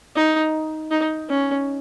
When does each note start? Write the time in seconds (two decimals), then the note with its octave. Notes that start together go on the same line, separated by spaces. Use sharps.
0.16 D#4
0.91 D#4
1.30 C#4